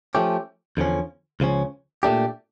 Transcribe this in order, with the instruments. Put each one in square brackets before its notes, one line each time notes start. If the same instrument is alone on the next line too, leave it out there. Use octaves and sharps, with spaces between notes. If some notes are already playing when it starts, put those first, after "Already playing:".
[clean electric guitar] F3 A3 C#4 G4
E2 D3 F3 C#4
C#2 C#3 F3 C#4
A#2 A3 D4 G4